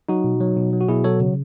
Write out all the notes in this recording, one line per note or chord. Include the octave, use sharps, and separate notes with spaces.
F#3 D#4 F#4
B2
F#3
B2
F#3
F#4
B2 E4 G#4
F#3 A4 C#5
C#3